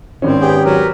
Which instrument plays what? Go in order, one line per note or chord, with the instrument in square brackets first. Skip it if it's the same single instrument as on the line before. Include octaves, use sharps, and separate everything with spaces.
[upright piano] G#1 C#4 [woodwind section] D#2 A2 [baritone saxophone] C4
[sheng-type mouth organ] B3 G#4 G5 [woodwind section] G4
[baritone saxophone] F#3 [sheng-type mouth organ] A#4 B4